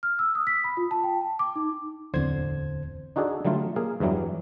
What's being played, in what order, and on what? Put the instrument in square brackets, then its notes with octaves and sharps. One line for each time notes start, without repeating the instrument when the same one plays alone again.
[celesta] F6
E6
D#6
B6
B5
F4
A5
G5
A5
D6
D#4
[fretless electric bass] D1 E2 C4 [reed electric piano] D3 C5 G#6
[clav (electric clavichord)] D4 D#4 F#4 G#4 A4 D5
D3 F#3 G3 A3 F4
A#3 G#4 F5
E2 G2 E3 F#3 G3